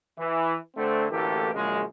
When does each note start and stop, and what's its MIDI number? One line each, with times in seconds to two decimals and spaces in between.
0.18 0.56 52
0.76 1.05 50
0.76 1.05 57
0.76 1.05 60
1.11 1.50 33
1.11 1.50 38
1.11 1.50 52
1.11 1.50 58
1.11 1.50 67
1.11 1.50 69
1.55 1.82 34
1.55 1.82 42
1.55 1.82 49
1.55 1.82 56